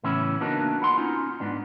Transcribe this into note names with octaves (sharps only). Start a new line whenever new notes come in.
A2 C#3 E3 B3 C#4 E4
A#3 B3 D4 D#4 F#4 A#4
E4 F#5 C6
C#4 D#4 F4
G#2 B3 D4